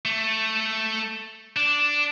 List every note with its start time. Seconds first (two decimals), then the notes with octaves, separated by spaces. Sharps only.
0.05 A3
1.56 D4